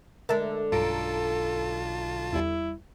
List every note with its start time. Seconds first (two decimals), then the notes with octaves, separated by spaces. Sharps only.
0.29 D3 G#3 A#4 E5 A5
0.72 B1 G2 F4 A4 A5 A#5 D7
2.33 E2 G3 E4